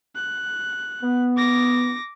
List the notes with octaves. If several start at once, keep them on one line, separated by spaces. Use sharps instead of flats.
F#6
B3
D6 A#6